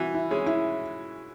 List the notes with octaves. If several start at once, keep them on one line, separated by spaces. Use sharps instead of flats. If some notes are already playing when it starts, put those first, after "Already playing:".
Already playing: E3 F#4
E4
G#3 C#4
E4